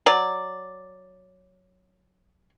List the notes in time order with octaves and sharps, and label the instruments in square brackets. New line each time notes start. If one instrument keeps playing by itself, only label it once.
[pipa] F#3 D5